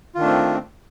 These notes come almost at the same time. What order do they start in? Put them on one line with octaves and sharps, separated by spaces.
F4 D#3 D4 A3 C4